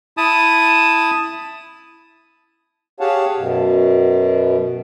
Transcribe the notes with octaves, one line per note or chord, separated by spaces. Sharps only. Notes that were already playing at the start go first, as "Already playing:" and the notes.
E4 A5 D#6
G4 G#4 C#5 F5 F#5 A5
F#2 B2